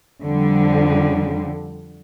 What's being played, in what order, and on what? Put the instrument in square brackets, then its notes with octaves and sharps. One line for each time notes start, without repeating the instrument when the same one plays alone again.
[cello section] F2 D3 G3